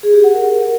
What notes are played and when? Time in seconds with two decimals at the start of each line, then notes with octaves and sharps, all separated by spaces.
0.03 G#4
0.14 G4
0.24 F#5
0.34 A#4